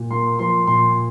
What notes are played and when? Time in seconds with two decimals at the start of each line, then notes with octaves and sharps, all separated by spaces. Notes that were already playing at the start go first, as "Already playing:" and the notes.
Already playing: A#2
0.11 A#3 C6
0.39 F3 C6
0.67 A#2 C6